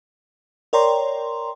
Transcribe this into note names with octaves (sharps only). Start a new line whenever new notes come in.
A#4 C#5 D5 G5 A#5 C6